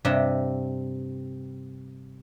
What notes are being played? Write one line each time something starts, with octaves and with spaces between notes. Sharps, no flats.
G2 C3 D#5 E5